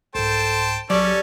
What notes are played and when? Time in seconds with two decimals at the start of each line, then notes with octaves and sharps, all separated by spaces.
0.15 C2 G#2 A4 C5 G5 A5
0.90 A#1 F#3 G3 C#4 A4 D5